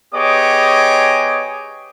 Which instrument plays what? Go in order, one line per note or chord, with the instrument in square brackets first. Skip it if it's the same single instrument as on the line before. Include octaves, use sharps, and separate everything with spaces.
[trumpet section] B3 G4 G#4 C#5 D#5 D6